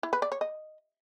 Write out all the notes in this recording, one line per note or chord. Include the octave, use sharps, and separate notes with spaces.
E4
B4
D5
C#5
D#5